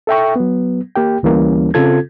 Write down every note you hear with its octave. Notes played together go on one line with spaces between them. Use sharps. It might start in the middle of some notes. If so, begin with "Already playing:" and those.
A4 E5 G5 C#6
F#3 B3
A#3 G4 G5
D2 E3 G3 A#3 C#4
C#3 C4 F4 A4 G#6